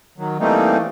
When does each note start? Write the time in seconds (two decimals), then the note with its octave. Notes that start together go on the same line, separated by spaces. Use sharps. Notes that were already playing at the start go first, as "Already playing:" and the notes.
0.18 D#3 F#3
0.39 E3 G3 A3 A#3 C4 D#4